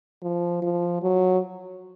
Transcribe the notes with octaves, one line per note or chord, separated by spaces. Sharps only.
F3
F3
F#3